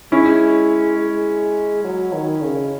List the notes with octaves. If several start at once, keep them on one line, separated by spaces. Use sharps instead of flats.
G#3 C#4 E4
G#3
F#3
D#3
C#3